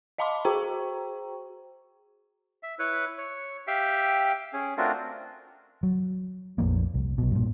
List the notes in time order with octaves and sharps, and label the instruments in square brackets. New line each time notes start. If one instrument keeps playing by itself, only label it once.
[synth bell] D#5 F5 A5 B5 C6 D6
F#4 G#4 C5 G5 A#5 C#6
[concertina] E5
E4 B4 C#5
C#5
G4 E5 F5 G5
C#4 G#4
A3 C4 D4 F4 F#4 A#4
[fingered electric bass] F#3
A#1 F2 F3 A#3
C2
B1 B2
G2 A#2